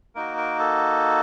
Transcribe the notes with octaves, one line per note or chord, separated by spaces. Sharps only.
A#3 D#4 F#4 A#4
A#4
A4